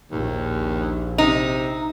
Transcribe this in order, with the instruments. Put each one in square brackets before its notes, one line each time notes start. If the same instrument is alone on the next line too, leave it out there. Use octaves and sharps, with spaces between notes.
[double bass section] A#1 [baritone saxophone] D#2
[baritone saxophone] C3 [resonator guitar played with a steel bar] D#4